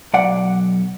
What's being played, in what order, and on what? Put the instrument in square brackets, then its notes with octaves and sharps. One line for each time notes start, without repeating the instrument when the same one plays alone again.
[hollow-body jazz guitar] B1 D5 F#5